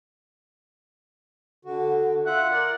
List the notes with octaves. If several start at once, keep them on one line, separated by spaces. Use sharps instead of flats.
D3 F#4
F4 E5 F#5
A#4 D5